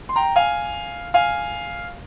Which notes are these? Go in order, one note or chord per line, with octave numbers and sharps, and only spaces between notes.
C6
G5 A#5
F5 G#5
F5 G#5